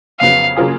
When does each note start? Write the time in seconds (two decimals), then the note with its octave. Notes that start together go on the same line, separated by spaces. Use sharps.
0.20 F2 C#3 F#3 B3 F5
0.56 C#3 F#3 A#3 F4 G#4